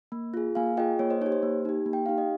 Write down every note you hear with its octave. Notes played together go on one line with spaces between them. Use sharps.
A#3
F4 G#4
A#3 F5 G#5
F4 G#4 D#5 G5
A#3 C#5
C5 D#5
D#4 C#5
G4
C5
A#3
D#4 G4
A#3
G5
D#4 G4 F5
D#5